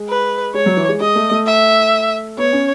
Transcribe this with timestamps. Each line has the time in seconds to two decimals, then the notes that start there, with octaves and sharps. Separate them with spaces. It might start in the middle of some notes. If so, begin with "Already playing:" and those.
Already playing: G#3
0.09 B4
0.54 G#3 C#5
0.66 F#3
0.77 E3
0.88 G#3
1.00 G#3 D#5
1.15 A3
1.31 A3
1.47 E5
2.38 B3 C#5
2.53 C#4